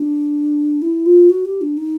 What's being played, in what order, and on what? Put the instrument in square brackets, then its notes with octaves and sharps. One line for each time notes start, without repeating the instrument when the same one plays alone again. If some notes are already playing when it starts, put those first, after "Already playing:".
Already playing: [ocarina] D4
E4
F4
F#4
G4
D4
D#4